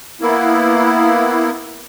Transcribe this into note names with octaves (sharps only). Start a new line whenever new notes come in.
A#3 B3 E4